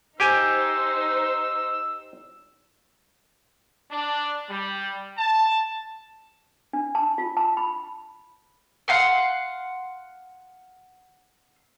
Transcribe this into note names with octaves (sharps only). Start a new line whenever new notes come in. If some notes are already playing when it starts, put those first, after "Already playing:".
D#4 G4 C5 G5 G#5 E6
D4
G3
A5
D4
A5
F4
A5
B5
F5 F#5 C6